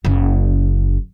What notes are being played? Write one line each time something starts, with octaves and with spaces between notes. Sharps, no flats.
F#1 C#3